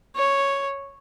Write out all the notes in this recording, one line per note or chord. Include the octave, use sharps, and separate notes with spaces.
C#5